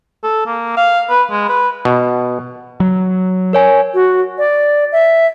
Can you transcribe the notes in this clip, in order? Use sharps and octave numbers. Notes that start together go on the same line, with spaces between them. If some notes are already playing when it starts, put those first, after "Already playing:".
A4
A#3
F5
B4
G#3
B4
B2
F#3
A#4 C#5 G#5
F#4
D5
E5